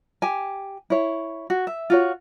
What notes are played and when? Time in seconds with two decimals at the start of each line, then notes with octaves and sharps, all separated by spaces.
0.22 G4 G#5
0.90 E4 C#5
1.50 F#4
1.67 E5
1.90 F4 F#4 C#5